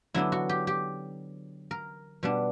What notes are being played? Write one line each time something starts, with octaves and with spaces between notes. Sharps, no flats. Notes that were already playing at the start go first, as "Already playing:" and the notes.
D3 F#3 B3 D4 E4
F#4
G4
G4
A#4
B2 G3 B3 D4